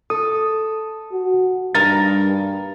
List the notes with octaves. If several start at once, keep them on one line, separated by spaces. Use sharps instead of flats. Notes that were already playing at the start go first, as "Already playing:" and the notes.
A4 D#6
F#4
G2 A#3 D#4 A#4 A6